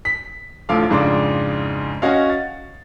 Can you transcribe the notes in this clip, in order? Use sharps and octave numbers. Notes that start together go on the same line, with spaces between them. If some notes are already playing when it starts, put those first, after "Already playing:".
B6
A1 D2 F3 A4 F5 D6
F2 G#2 C#3 D4 C6 D6
C#4 F#4 C#5 D#5 F5
A6